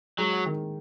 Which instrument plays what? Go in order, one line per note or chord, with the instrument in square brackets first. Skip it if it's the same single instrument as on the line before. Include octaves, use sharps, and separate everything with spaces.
[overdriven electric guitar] F#3 [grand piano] G#3
[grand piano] D#3